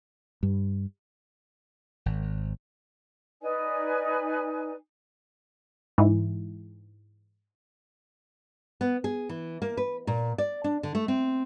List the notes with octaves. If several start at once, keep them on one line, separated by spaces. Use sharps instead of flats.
G2
G#1
D#4 B4 D5 G#5
G#2 E3
B3
G#4
E3
A#3
B4
A#2
D5
D4
D3
A3
C4